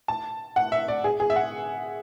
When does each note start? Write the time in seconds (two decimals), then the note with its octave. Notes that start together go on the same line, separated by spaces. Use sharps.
0.08 A5
0.56 F#5
0.72 E5
0.88 D5
1.04 G#4
1.20 G#4
1.30 E5
1.36 F#5